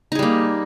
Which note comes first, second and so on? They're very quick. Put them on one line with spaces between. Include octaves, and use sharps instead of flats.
D#4 G#4 G3 A#3